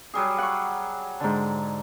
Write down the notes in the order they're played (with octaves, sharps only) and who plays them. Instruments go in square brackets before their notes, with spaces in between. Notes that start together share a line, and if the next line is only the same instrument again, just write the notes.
[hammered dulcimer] F#3 G3 G#4
[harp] F#5 C#6
G#2 D3